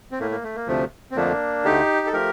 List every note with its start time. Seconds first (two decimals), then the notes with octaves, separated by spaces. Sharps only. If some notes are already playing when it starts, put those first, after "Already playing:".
0.11 C4
0.19 A2 A3 A#3
0.31 A#3
0.43 A3
0.55 A#3
0.67 D2 C3 F3 A3
1.11 C4
1.16 F2 D3 F3 A3 A#3 D4
1.65 D2 D3 A3 D#4 G4
2.06 A4
2.13 F3 A3 G4 A#4